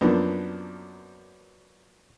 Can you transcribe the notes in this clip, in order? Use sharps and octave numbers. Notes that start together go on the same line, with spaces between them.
F#2 F3 A#3 B3 D4